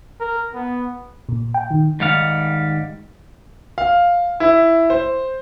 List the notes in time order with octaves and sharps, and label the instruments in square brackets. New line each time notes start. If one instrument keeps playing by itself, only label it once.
[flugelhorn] A#4
B3
[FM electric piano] A#2
G5
D#3
[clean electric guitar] G#2 D#3 G3 F5 F#5
[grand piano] F5
E4
C5